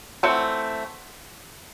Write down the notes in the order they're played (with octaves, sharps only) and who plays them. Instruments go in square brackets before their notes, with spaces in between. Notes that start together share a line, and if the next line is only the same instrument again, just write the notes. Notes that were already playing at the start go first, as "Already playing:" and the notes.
[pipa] E3 A3 C4 F#5